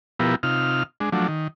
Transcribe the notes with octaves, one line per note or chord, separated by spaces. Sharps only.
B2 F3 B3 E4 G4 A#4
C3 D#4 F4 F6
G#3 D4
F3 F#3 A3 D4
D#3